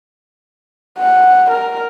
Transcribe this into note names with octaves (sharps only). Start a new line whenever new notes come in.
F#5
A#4